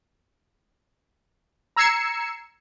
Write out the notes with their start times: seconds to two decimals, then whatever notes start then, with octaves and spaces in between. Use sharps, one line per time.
1.76 A#5 E6 G#6 C7 C#7 E7